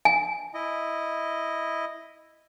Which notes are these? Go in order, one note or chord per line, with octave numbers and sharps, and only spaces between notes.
G#5
E4 D#5